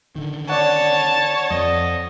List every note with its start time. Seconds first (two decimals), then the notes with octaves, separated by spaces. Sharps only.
0.16 D3 D#3
0.49 C#5 D5 F#5 A5
1.50 F2 F3 D#5